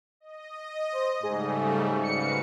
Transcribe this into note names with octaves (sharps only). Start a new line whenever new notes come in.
D#5
C5
G#2 C#3 G3 A3 G#4
F#4 B4 F5 C#7